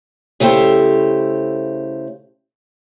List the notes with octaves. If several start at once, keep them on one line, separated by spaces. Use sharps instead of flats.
C#3 A3 E4 G4 C5